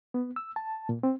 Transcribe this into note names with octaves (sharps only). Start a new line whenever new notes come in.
B3
E6
A5
A#2
C4